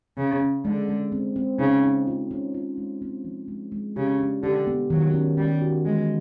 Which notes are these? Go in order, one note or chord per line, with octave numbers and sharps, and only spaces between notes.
C#3 C#4
C#4
D3 G#3
G#3
C4
C4
C#3 D#4
D#4
F4
C#4
F4
G#3
C4
F3
G#3
G#3
C#3 G4
D4
D3 G4
B3
D#3 F#3
C#4
G3 C#4
F#4
E3 G#3